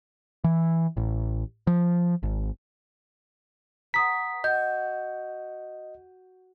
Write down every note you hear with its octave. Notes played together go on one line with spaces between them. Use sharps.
E3
A1
F3
G#1
B3 A#5 D#6 B6
F#4 D#5 G6